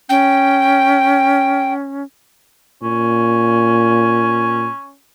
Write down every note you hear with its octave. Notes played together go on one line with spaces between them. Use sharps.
C#4 G5
A#2 C#4